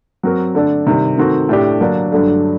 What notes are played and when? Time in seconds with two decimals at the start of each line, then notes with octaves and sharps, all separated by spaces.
0.23 F#3 C4 F#4 A#4
0.55 D3 A3 D4 A4
0.87 C3 D#3 G3
1.18 D#3 A3 C4 F#4
1.49 A2 A3 D4 G4
1.80 D3 F#3 A#3 D4
2.12 G2 D3 F#3 A3 D4